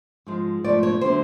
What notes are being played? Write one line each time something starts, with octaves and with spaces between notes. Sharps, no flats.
G#2 F3 G#3
G#2 F3 A3 D5
C#5
D3 F#3 A3 C5